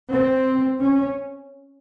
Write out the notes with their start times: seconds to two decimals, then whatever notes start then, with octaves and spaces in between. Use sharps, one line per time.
0.11 C4
0.79 C#4